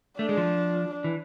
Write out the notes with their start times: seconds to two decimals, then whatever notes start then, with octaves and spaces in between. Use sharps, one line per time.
0.19 A3 D4
0.29 G#3
0.37 F3
1.04 E3